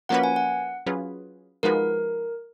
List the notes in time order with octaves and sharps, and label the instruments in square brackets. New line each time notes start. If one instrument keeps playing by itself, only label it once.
[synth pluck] F3 A#3 C#4 F#4 B4 [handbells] F#5
[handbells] G#5
F#5
[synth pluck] F#3 C#4 F4 G#4 B4
[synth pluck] F3 G#3 D#4 F#4 B4 [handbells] A#4